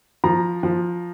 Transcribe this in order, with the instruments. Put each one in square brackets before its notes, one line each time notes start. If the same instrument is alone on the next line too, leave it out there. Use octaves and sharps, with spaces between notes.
[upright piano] F3 A#5
F3